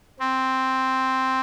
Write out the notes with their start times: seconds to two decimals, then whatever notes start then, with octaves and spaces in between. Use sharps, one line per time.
0.20 C4